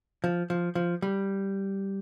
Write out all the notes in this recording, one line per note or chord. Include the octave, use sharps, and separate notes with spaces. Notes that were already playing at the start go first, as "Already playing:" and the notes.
F3
F3
F3
G3